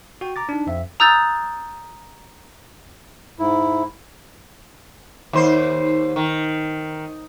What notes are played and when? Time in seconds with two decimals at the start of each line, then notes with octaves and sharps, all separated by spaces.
0.21 F#4 G5
0.36 A#5 D6 A6
0.49 D4 D#4
0.67 F2 E5
1.00 A#5 D#6 E6 F#6 G6 A6
3.39 G#2 E4
5.33 D#2 C5
6.16 D#3